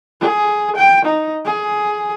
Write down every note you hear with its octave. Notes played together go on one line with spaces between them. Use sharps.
G#4
G5
D#4
G#4